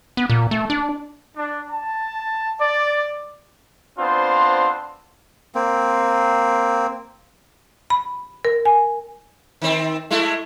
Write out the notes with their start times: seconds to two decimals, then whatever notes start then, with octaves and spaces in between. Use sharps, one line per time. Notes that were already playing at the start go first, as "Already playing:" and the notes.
0.17 B3
0.30 A#2
0.51 A3
0.70 D4
1.36 D4
1.70 A5
2.61 D5
3.98 B3 C4 D4 F4 C5
5.55 A#3 C4
7.90 B5
8.45 A#4
8.65 G#5
9.62 D#3 C4
10.11 G#3 A3 E4